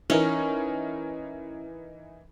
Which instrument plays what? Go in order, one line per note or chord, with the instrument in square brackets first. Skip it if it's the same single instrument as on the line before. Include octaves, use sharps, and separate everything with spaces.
[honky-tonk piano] E3 D#4 A#4 [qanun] C#4